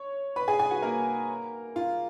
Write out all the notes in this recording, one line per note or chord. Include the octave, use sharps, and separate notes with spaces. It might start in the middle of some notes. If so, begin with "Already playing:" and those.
Already playing: C#5
B4 B5
G#4 G#5
G#4 G#5
F#4 F#5
A#3 A#4
F4